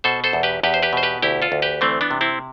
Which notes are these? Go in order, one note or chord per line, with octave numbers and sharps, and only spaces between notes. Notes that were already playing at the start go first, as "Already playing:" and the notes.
B2 A4 C5
A4 C5
E2
G4 B4
E2 G4 B4
C5
G4 B4
B2 C5
G4 B4
D2 E4 G4
F4 A4
D2
G4 B4
E3 A3 C4
B3 D4
C3
C4 E4